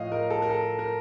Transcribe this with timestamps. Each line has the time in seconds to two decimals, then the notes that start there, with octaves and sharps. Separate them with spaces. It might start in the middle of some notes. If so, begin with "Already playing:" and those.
Already playing: A2 F3 D#5 F5
0.12 A#4
0.30 A4
0.42 A#4
0.50 A4
0.79 A#4